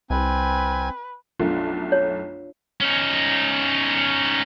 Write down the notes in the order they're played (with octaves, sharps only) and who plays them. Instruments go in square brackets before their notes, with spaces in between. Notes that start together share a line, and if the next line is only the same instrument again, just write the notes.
[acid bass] C2 [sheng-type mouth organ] C4 G#5 [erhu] B4
[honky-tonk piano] B1 F#2 A3 [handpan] D4 F4
[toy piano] C#5
[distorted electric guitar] C#4 D#4